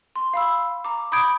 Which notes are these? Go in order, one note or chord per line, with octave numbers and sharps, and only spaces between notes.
C6
F5 B5 E6
A#5 D6
B5 D#6 G6 G#6 D7